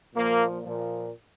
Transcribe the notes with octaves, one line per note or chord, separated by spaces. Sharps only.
A#2 F3 A#3
A#2 F3